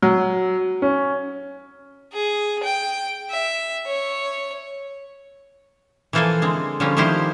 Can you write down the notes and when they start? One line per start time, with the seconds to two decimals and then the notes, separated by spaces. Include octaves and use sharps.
0.03 F#3
0.82 C#4
2.13 G#4
2.64 G5
3.30 E5
3.87 C#5
6.13 E3 F3 A#3 A4 C5 G#5
6.42 D3 G#3 C4
6.80 D3 F3 G3 A#3 C4 C#4
6.97 D#3 F3 D#4 E4 G4 C5